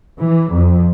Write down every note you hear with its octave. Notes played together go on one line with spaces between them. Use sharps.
E3
F2